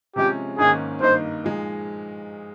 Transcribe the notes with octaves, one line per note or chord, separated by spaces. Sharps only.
C3 F3 G#3 C#4 G4
G#2 D#3 A#3 C#4 G#4
G2 D#3 A#3 D#4 C5
A#2 F3 G#3 D#4